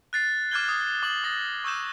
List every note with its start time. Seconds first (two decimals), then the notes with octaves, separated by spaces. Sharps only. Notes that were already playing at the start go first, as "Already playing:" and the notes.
0.13 F#6 A6 C7
0.51 D6 F6 F#6 G#6 G7
0.68 D#6
1.03 D6 F#7 G7
1.24 D#6 A6 A#6
1.64 C#6 E6 G6 E7